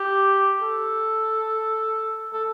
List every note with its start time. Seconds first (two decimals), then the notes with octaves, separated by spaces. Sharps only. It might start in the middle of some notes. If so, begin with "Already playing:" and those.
Already playing: G4
0.61 A4
2.33 A4